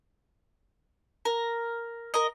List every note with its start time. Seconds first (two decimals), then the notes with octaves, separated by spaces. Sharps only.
1.25 A#4
2.14 A#4 D#5